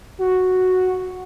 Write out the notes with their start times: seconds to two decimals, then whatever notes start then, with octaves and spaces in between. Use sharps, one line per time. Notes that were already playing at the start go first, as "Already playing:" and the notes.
0.21 F#4